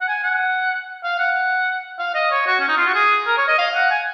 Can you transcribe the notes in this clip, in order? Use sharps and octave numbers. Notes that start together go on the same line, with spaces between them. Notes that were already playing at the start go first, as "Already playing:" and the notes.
F#5
G#5
F#5
F5
F#5
F5
D#5
C#5
F#4
C#4
D#4
F4
F#4
G#4
A#4
C#5
D#5
F5
F#5
G#5